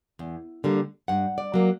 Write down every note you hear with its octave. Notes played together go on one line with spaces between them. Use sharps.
E2
D3 G3 A#3
G2 F#5
D5
F#3 A#3